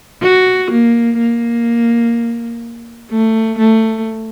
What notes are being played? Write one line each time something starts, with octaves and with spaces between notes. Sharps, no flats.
F#4
A#3
A#3
A3
A3